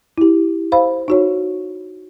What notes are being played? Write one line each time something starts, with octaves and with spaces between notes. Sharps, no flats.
E4 G4
C5 F5 B5
D#4 F#4 C#5